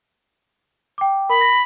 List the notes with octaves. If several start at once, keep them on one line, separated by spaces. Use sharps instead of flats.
G5 D6
A#4 B5
A#6